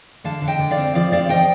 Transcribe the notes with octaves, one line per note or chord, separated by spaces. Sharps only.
D3 F5 A5
D3
D#5 G5
D3
D5 F5
C4
F3 D5 F5
C4 D5 F5
F3 D#5 G5